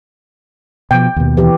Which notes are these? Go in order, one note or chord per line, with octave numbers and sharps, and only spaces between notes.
B2 F3 G5
D#2 B2
E3 G4